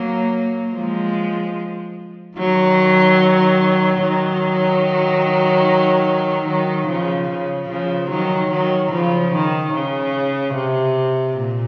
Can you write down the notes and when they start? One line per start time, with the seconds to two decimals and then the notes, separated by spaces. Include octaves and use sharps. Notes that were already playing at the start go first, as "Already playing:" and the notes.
Already playing: F#3 A#3
0.74 F3 G#3
2.38 D#3 F#3
4.01 D#3 F#3
6.46 D#3 F#3
6.87 C#3 F3
7.29 C#3
7.69 C#3 F3
8.10 D#3 F#3
8.51 D#3 F#3
8.91 C#3 F3
9.33 D#3
9.73 C#3
10.55 C3
11.37 A#2